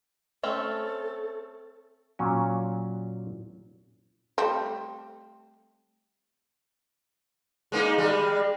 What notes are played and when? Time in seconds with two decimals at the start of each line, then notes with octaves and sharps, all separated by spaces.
0.43 A3 C4 C#4 A4
2.19 A#2 F#3 C#4
4.38 G3 A3 C4
7.72 G#3 A#3 D#4
7.98 G3 G#3